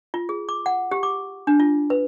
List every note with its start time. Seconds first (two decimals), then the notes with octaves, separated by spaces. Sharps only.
0.14 F4
0.29 G#4
0.49 D6
0.66 F#5
0.91 G4
1.03 D6
1.47 D4
1.60 F4
1.90 B4